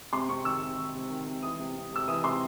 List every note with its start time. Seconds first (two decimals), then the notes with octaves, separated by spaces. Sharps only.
0.12 C3 C6
0.29 C3 C#6
0.45 D#3 E6
0.61 C3
0.77 D#3
0.94 C3
1.10 D#3
1.26 C3
1.42 E3 D#6
1.59 C3
1.75 C3
1.92 C3 E6
2.08 E3 D#6
2.24 C3 C6